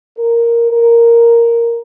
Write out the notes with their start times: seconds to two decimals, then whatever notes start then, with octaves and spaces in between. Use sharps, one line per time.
0.18 A#4
0.72 A#4